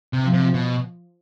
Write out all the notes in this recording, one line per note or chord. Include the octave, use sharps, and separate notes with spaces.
C3
F3
C3
B2